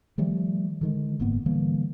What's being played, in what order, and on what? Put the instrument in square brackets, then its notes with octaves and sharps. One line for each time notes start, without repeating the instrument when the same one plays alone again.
[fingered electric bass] D#3 F3 G3 A3
D3 D#3 G#3
F#1 G#2 A#3 B3
D3 E3 G3 A#3